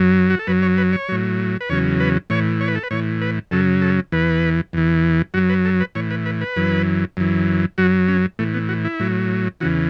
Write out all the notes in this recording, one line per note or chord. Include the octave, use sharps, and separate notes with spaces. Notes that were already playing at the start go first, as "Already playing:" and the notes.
Already playing: F#2 F#3
F#4
A4
F#2 F#3 B4
C#5
B4
C#5
A2 F#3
B4
E2 C#3 F#3 C#5
B4
A2 E3 C#5
C#5
B4
A4
B4
A2 E3 C#5
B4
F#2 C#3 F#3 A4
A4
E2 E3 B4
E2 E3
F#2 F#3 F#4
B4
A4
B4
A2 E3 C#5
B4
B4
B4
F#2 E3
F#2 E3
F#2 F#3 F#4
C#4
A2 E3 A3
B3
F#4
E4
A2 F#3
E2 C#3 E3 F#4